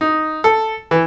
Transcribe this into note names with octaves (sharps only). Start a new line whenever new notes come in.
D#4
A4
E3